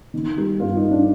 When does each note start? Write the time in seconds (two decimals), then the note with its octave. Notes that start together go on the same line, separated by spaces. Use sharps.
0.14 D#3
0.37 G3
0.60 G2 F4
0.77 D#4
0.84 G2
0.91 D4